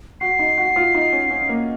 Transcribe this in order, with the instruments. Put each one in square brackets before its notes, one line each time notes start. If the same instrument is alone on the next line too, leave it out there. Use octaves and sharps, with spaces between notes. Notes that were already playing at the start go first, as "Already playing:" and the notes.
[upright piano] F#4 [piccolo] C7
[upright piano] D#4
F#4
F4
D#4
C#4
C#4
A#3